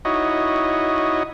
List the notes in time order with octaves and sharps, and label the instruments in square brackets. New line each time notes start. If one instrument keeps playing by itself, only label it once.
[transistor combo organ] D#4 E4 F#4 C#5 D#5